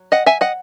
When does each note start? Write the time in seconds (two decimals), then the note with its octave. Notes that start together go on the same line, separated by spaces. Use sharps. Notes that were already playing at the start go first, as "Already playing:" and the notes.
Already playing: F#3
0.12 D#5 F#5
0.26 E5 G#5
0.41 D#5 F#5